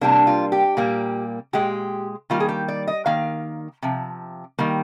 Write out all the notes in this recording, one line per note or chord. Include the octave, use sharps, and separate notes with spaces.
C3 G3 A#3 D4
F4
G4
A#2 G3 A#3
A#2 G#3 G4
D#3 G3 A#3 F4
G#4
G4
D5
D#5
D#3 A#3 F5
C3 F3
D#3 G3 A#3